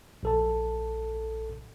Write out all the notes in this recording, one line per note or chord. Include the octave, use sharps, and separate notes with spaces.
A#1 A4 A5